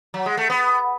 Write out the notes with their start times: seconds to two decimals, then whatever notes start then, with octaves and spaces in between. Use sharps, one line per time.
0.14 F#3
0.26 G#3
0.37 A3
0.50 B3